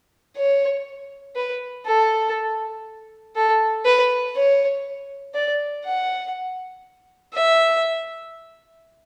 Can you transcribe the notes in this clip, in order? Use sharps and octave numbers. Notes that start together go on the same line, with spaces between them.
C#5
B4
A4
A4
B4
C#5
D5
F#5
E5